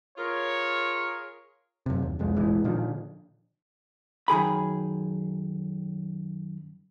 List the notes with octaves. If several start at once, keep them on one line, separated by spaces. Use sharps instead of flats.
F4 G#4 A#4 C#5
F#2 C3
D#2
C2 F2 G#3
F1 A#1 E3 G#3
A#2 D3 D#3 F3
F#2 D#3 G#4 B5